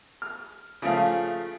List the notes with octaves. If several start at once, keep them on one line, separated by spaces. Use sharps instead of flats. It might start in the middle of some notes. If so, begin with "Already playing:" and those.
F6
C#3 F3 A3 F5